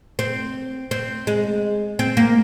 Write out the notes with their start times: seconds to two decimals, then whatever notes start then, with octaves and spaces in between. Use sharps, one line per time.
0.19 C4
0.91 C4
1.27 G#3
1.99 C4
2.17 A#3